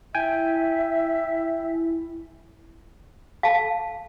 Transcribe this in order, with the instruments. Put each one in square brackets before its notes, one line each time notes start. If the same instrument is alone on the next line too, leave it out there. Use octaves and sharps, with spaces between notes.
[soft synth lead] E4 [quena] E5 [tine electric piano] G5 G#5
[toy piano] F5 A5